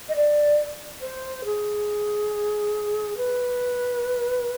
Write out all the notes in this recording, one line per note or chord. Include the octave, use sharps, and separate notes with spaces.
D#5
D5
C5
G#4
B4